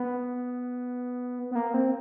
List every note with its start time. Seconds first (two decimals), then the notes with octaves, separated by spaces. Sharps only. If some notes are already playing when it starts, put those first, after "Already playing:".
Already playing: B3
1.51 B3
1.55 A#3
1.74 C4